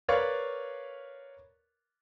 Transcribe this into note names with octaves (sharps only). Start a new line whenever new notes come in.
A#4 B4 C#5 D5 F5 C#6